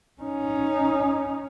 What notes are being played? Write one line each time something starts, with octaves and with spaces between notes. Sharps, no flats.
C#4 D#4